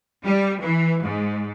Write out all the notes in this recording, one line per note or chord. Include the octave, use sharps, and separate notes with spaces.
G3
E3
G#2